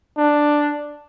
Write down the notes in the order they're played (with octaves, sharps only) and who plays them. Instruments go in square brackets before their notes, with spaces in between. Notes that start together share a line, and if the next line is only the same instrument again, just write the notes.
[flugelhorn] D4